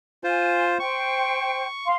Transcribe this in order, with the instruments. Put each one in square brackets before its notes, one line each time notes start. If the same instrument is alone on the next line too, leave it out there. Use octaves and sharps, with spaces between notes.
[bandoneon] F4 C5 [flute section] G#5
[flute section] C5 G5 [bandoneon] C#6
[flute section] F5 C6